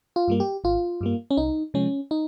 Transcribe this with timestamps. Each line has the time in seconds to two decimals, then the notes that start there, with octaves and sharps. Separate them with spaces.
0.16 F4
0.28 G2 G3 A#3
0.40 G4
0.64 G#1 F4
1.01 G2 G3 A#3
1.31 C#4
1.37 C2 D#4
1.74 C3 F3 G#3 C#4
2.11 D#4